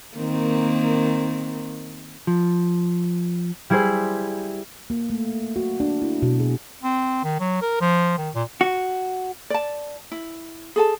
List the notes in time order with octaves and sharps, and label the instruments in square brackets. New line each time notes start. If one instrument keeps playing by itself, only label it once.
[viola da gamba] D#3 A#3 C4
[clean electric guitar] F3
[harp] G3 E4 G#4 C5
[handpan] A#3
A3
F#4
D4
E4
B2
G#4
[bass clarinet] C4
D#3
F#3
A#4
F3
D#3
A#2
[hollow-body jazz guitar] F#4
[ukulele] D5 A5
E4
G#4 A4 A5